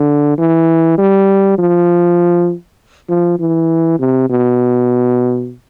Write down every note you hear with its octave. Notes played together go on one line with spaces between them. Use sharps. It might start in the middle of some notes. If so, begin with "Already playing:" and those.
Already playing: D3
E3
G3
F3
F3
E3
C3
B2